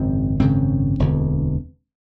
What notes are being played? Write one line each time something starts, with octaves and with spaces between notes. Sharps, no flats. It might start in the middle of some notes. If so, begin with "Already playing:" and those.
Already playing: G#1 F#2 C#3 C4
G#1 F#2 C#3 C4
E1 D2 D3